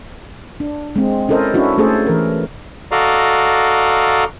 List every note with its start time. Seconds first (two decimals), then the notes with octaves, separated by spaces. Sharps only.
0.60 D4
0.96 G#3 C4
1.29 C#4 E4 A4 A#4 C5 D#5
1.54 C#4 D4 E4 F#4
1.78 A3 C#4 G#4 A4 C5
2.07 E3 A#4
2.91 F#4 A4 D5 D#5 F5 A#5